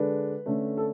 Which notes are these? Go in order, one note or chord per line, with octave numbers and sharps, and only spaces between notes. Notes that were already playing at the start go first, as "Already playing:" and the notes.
Already playing: D3 G#3 D4 B4
D3 A3 C#4
A4